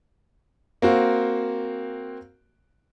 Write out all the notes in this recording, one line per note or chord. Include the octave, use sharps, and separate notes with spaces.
A#3 C4 F#4